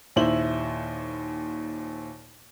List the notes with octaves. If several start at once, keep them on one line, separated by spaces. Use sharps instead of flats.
D#2 A#2 E4 C5 F#7